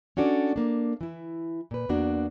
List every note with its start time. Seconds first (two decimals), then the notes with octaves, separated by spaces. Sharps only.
0.17 C#4 D4 F#4 A4 D5
0.56 A#3 D4
1.01 E3 E4
1.71 A#2 B4
1.89 E2 A#3 D4 F#4